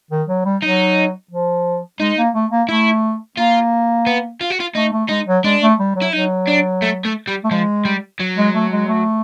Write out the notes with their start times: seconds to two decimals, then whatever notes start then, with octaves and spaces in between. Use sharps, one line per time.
0.11 D#3
0.28 F#3
0.45 G3
0.62 F#3 D#4
1.31 F3
2.00 G#3 D#4
2.17 A#3
2.34 A3
2.51 A#3
2.69 A3 E4
3.37 A#3 F4
4.06 B3
4.41 F4
4.51 F#4
4.60 F4
4.75 A3 D#4
4.92 A3
5.09 G#3 D#4
5.27 F#3
5.44 G#3 D4
5.61 A3
5.79 G3
5.96 F#3
6.02 E4
6.13 F#3 D#4
6.47 D4
6.82 A3
7.05 A3
7.27 G3
7.44 A3
7.51 F3 G#3
7.85 G3
8.20 F#3
8.37 G#3
8.54 A3
8.71 G#3
8.88 A3